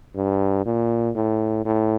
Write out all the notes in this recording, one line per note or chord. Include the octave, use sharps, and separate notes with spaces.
G2
A#2
A2
A2